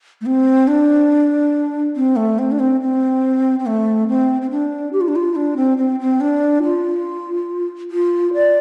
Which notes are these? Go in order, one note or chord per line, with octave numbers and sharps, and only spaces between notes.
A3
C4
D4
C4
A3
C4
D4
C4
C4
C4
A3
C4
C4
D4
G4
F4
D4
F4
D4
C4
C4
C4
D4
F4
F4
D5